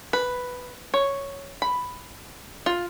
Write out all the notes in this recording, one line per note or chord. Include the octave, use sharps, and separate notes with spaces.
B4
C#5
B5
F4